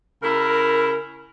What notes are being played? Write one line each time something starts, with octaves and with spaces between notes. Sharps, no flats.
C#3 E4 A#4